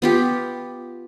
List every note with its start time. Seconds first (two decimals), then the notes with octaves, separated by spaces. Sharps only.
0.02 B3 F4 G4